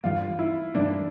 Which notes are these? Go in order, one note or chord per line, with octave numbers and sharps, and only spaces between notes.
G2 E3 G3 A#3 F4
E4
G2 E3 G3 A#3 D4